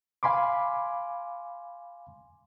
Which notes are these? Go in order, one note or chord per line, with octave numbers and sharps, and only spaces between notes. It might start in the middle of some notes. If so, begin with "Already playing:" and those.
F5 G#5 B5 C6 D6